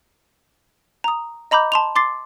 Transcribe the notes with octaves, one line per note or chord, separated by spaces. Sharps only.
A#5 D#6
D#5 A#5 B5 D6 G6
A5 C6 F7
C6 D6 A6 C7